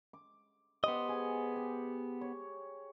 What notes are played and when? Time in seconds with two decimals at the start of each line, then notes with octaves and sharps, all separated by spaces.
0.13 D6
0.84 B3 G4 C5 D#5 C6
1.09 G#4
1.56 G4
2.21 C#5